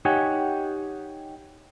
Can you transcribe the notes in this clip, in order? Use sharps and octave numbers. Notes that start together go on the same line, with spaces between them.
D#4 G4 C#5 F#5 G#5